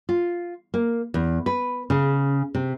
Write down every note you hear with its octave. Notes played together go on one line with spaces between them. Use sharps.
F4
A#3
E2
B4
C#3
C3